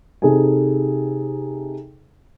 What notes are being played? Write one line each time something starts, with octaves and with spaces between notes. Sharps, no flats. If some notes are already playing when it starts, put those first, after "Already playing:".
C3 D#4 G#4 A4 G#5